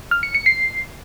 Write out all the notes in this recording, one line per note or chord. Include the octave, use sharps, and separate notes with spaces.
F6
C#7
C#7
C7